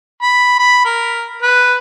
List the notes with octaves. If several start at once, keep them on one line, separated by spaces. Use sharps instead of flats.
B5
B5
A#4
B4